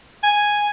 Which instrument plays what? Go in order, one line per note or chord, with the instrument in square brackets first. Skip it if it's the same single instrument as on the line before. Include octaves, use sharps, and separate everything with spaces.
[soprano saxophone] G#5